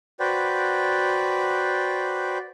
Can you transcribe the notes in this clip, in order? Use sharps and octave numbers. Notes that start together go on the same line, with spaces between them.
F#4 B4 C5 D5 G5